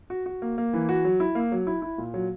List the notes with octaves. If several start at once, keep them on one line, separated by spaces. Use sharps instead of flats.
F#4
F#4
A#3
A#3
E3
F#4
F#3
E4
A#3
F#3
E4
E4
A#2
F#3